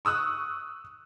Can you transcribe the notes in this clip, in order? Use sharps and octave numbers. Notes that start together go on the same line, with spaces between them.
C#6 D#6 E6 F#6